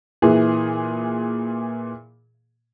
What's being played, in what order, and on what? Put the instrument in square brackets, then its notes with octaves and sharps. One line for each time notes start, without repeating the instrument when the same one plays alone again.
[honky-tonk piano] A#2 E3 G#4